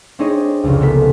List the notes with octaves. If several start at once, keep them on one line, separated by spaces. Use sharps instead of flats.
C4 D4 D#4 G#4 C#5 D#5
F1 C#2
A#3 B3 A4 B6